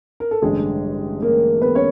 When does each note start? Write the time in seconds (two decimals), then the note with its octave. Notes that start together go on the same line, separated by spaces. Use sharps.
0.20 A#4
0.31 A4
0.42 A1 G2 D3 G#3 G#4
1.22 A#3 A#4
1.62 B3 B4
1.75 C#4 C#5